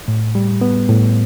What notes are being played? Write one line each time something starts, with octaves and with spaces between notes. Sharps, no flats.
A2
G3
B3
A2